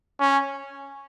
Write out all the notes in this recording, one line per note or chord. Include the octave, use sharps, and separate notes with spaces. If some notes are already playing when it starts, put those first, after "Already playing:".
C#4